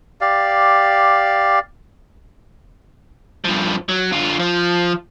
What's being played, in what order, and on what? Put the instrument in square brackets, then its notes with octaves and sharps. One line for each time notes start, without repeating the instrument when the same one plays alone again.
[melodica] G4 D5 F5
[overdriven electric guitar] G2 F3
F#3
D3 F4
F3